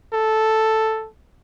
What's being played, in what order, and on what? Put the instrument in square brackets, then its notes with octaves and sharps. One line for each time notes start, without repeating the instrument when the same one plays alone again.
[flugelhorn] A4